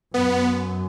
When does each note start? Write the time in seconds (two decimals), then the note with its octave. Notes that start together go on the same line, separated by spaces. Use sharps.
0.14 F#2 B3